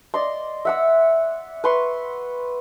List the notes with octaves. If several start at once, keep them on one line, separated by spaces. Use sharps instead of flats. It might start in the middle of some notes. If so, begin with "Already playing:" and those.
D5 D#5 C6
E5 F#5 E6
B4 C6 C#6